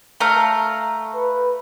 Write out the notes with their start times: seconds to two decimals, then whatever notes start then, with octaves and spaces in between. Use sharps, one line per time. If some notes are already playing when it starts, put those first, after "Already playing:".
0.20 A3 F5 A#5
1.15 B4